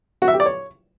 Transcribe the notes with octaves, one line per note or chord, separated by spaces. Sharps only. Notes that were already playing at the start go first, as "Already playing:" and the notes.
F#4
E5
G4
D5
C#5